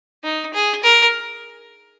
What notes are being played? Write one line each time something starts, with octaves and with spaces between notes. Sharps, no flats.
D#4
G#4
A#4